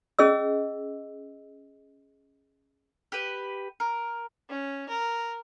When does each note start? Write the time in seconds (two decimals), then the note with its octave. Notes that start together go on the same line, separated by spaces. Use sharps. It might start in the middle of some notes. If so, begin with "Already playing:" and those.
0.19 C#4 G#4 D#5 E6
3.12 G4 B4
3.80 A#4
4.50 C#4
4.89 A#4